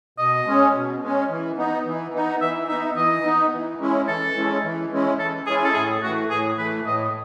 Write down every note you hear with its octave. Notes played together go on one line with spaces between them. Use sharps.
B2 D#5
G#3 C#4
B2
G#3 C#4
E3
B3 D#4
E3
B3 D#4
E3 E5
B3 D#4 E5
E3 D#5
B3 D#4
E3
G#3 C#4 E4
E3 A4
G#3 C#4 E4
E3
G#3 C#4 E4
E3 A4
G#3 C#4 E4 G#4
A4
A2 G#4
E3 A3 F#4
A2 G#4
E3 A3 B4
A2 D#5